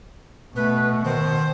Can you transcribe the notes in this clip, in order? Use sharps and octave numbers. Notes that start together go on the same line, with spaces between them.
B2 A3 B4
D#3 C5